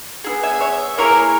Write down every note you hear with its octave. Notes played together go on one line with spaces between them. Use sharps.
B3 E4 G#4
E5 G#5
C#5 E5
A#3 E4 G#4 A#4 C#5